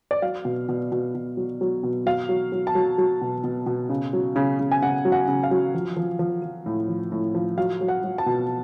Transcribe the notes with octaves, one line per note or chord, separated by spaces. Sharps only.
D5
F#3 F5
B2
B2
B2
B2
F#3
F#3
B2
F#3 F5
F#3
F#3
A5
F#3
F#3
B2
B2
B2
C#3
F#3
C#3
C#3
G#5
C#3 F#5
F#3
F#5
C#3
F5
F#3
F3
F3
F3
F3
A2
F3
A2
F3
F#3 F5
F#3
F#5
F#3
A5
B2